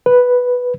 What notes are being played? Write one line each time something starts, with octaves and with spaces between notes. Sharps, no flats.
B4